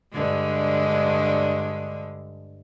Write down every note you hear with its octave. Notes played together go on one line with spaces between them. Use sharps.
G2 D3 G#3